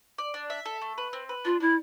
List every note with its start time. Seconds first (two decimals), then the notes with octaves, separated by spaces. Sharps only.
0.18 D5
0.34 D4
0.50 E5
0.66 A4
0.82 A3
0.98 B4
1.13 C4
1.29 B4
1.45 D4 F4
1.60 D4 E4